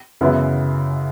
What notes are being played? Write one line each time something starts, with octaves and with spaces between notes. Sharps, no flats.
F#2 C#3 E3 B3 E4